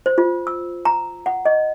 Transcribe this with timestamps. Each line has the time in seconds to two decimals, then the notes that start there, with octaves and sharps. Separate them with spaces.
0.06 C5
0.18 F4
0.47 E6
0.85 A#5
1.26 F#5
1.45 D#5